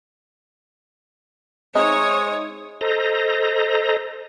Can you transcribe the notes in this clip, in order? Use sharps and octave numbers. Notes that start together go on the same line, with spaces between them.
G#3 C4 D#4 C#5 E5 D#6
A4 C5 D#5 A#5